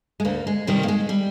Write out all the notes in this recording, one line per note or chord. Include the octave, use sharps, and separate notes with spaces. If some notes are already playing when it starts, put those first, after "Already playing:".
G#3
D2 A#3
G#3
C3 D#3 G3
A#3
G#3
G3